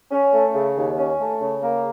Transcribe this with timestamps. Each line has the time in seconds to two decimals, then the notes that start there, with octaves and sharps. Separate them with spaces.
0.11 C#4
0.32 A3
0.54 C#3
0.76 D#2
0.97 C#4
1.19 A3
1.41 C#3
1.62 A#3